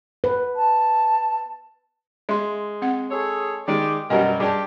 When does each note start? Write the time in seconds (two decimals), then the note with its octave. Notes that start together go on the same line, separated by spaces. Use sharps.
0.24 B4
0.56 A5
2.29 G#3 E5 C6
2.82 C4 F#5
3.10 G#4 A4 C#5
3.68 D#3 G#3 G4 D5
4.10 F#2 B2 F#3 G3 A#4 D#5 G#5
4.40 G2 G4 G#4 D5 A5